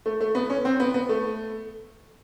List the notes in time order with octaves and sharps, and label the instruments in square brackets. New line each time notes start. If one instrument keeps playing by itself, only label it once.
[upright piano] A3
A3
B3
C#4
C4
B3
B3
A3